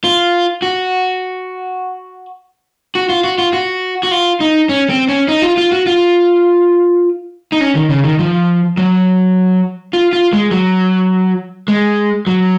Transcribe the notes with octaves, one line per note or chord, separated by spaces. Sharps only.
F4
F#4
F#4
F4
F#4
F4
F#4
F#4
F4
D#4
C#4
C4
C#4
D#4
F4
F4
F#4
F4
D#4
C#4
D#3
C#3
D#3
F3
F#3
F4
F4
G#3
F#3
G#3
F#3